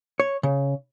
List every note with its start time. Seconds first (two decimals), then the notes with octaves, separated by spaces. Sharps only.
0.20 C#5
0.43 C#3